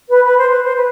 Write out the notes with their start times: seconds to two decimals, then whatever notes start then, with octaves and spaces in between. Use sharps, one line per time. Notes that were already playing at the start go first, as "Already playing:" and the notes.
0.09 B4
0.24 B4
0.38 C5
0.50 B4
0.64 C5
0.75 B4